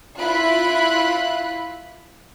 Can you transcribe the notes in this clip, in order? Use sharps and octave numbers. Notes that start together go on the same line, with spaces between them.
E4 F4 B5 F#6